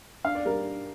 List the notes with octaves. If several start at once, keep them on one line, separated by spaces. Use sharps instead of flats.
D4 F5
D5
G3 A#4